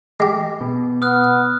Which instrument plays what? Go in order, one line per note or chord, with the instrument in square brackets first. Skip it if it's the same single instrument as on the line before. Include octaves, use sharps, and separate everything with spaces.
[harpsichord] G#3 G4
[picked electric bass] B2
[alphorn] B3 [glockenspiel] D#6 F6 F#6